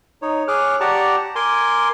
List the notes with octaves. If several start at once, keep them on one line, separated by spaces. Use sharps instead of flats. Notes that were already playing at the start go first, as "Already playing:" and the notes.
D#4 C#5
G#4 C#5 D6 F6 F#6
G4 D5 F#5 A5 A#5 C#6
A#4 G#5 C6 D6